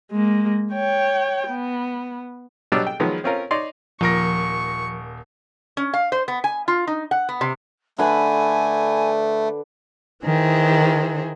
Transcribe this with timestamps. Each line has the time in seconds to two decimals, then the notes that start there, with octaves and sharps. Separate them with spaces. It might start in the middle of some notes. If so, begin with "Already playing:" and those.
0.11 G#3 A#3
0.73 C#5 G5
1.49 B3
2.72 B2 F#3 G3 D4 E6
2.87 G5
3.00 D#3 F3 F#3 G#3 B3
3.24 C4 C#4 F4 A#4
3.51 D#4 C#5 D5 C6
4.01 D#1 F3 A#4 C#6 A#6
5.77 C#4
5.94 F5
6.12 C5
6.28 B3
6.44 G#5
6.68 F4
6.87 D#4
7.11 F#5
7.29 B3
7.41 C3
7.98 D3 A3 B4 G#5 B5
10.25 D#3 E3 G#4 C5